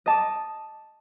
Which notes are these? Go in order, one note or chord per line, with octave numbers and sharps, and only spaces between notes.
D#5 A5 D6